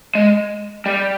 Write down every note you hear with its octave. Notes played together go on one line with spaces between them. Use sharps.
G#3
G3